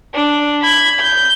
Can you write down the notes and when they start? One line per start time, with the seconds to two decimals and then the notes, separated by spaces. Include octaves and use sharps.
0.14 D4
0.61 B5 G#6
1.00 G6